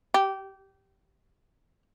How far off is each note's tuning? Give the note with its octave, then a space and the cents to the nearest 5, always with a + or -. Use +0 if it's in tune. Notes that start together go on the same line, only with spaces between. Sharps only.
G4 -20